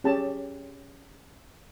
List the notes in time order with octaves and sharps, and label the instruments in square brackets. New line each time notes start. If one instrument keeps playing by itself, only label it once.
[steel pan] C#4 G4 G#4 A5